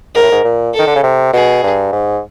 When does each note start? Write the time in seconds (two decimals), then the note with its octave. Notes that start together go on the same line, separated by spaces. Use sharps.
0.15 G#2 A#4
0.23 A2
0.32 G#2
0.45 A#2
0.74 A4
0.79 D#3
0.87 D3
0.95 C#3
1.03 C3
1.33 B2 G#4
1.63 G2
1.92 G#2